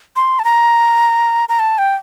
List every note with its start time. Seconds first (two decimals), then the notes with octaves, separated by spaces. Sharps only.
0.16 C6
0.39 A5
0.44 A#5
1.49 A#5
1.59 A5
1.78 G5